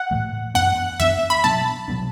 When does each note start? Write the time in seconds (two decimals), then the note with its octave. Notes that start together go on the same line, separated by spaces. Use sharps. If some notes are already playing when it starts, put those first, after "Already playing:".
Already playing: F#5
0.11 A2 E3 A3
0.55 F#2 E3 B3 D4 F#5
1.00 F#2 E3 B3 D4 E5
1.30 B5
1.44 B2 F#3 B3 D4 A5
1.88 B2 F#3 B3 D4